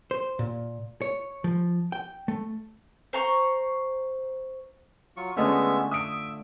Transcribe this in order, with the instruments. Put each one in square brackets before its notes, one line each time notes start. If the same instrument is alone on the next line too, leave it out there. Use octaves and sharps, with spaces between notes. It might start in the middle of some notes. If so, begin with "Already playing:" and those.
[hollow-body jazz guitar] C5
A#2
C#5
F3
G5
A3
[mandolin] C5 A#5 C#6
[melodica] F#3 F4 C#6
[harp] D3 A3 F4 [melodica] G#3 B3 E5 [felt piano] C#4 D#5
[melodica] E5 [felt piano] D#6 D7